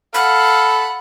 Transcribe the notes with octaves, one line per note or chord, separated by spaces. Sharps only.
A4 F5 F#5 B5